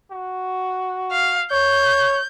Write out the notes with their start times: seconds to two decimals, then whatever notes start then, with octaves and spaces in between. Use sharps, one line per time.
0.11 F#4
1.12 F5
1.51 C#5 G6